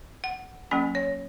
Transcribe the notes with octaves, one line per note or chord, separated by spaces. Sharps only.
F#5
F#3 A#3 C#4 G#5
C#5